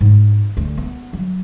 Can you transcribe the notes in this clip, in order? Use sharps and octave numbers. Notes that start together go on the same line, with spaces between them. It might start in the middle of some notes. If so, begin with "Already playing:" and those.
G#2
D2
B3
F#3